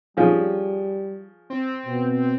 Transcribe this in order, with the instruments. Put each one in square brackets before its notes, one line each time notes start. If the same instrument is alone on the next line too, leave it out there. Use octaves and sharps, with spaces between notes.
[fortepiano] F3 C#4 G#4 [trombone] G3
[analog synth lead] C4
[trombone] B2